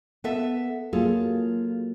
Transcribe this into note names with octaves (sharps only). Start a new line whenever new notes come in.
B3 A4 E5
F#3 A#3 F4 G#4 A4